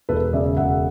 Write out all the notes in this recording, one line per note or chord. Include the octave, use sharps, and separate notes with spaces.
E1 A4 B4
C#3 D5 E5
E1 E5 F#5